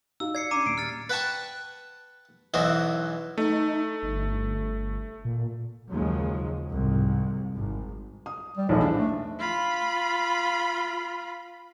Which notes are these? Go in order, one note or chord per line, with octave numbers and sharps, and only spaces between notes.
D#4 F#4 F5 E6
D5 G#6 C7 C#7
C#4 D4 A#5 D6 D#7
D#1 C7 D7
F6 A6
B4 F#5 G5 A5 C#6
B1 E2 E3 F#4 C5 D#5
A3 D#4
G1
A#2
D#2 C#3 F3 F#3 G#3
C2 F2 G#2
G#1
D#6
G3
B1 E2 A2 F3
D4
A3
F4 B5